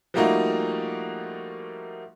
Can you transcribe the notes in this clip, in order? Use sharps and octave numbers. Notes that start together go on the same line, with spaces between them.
F3 G3 A3 A#3 D#4 F#4